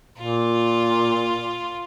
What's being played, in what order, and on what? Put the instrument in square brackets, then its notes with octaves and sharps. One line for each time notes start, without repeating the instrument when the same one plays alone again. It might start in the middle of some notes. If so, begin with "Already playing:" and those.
[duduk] A#2 [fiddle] F4